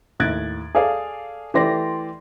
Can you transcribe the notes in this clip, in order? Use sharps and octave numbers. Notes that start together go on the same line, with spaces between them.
D#2 A2 F#6 G#6 A6 D7
G#4 A4 D5 F5 G#5
E3 A3 G4 D5 C6 A#6